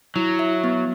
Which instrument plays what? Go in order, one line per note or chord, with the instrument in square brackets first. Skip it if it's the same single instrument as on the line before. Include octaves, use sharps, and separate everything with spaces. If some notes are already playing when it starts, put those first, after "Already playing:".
[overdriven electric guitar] F#3 [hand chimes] E4
[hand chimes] E5
B3